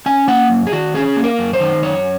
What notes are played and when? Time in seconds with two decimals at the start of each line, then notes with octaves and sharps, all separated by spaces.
0.06 C#4 G#5
0.28 A#3 F#5
0.50 F#2
0.67 G#4
0.72 D#3 F#4
0.94 C#4 G#4
1.16 A#3
1.24 A#4
1.39 F#2
1.53 C5
1.60 D#3
1.83 F#2 C#5